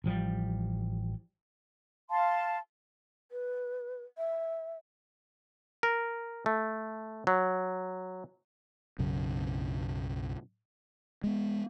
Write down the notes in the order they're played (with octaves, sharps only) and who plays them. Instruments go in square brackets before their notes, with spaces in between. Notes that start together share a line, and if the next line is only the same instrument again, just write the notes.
[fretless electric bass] A1 F3 G3
[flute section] F5 A5 C6
[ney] B4
E5
[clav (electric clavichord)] A#4
A3
F#3
[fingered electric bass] B1 F#2 C#3
G#3 B3